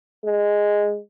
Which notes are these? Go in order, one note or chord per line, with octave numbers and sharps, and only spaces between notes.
G#3